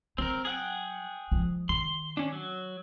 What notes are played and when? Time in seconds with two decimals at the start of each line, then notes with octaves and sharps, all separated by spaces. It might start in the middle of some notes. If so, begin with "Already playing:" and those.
0.18 F#3 C4 A#4
0.45 G#4 F#5 G5
1.32 F3 G#3
1.69 D#3 C6
2.17 C#4 D4
2.32 F#3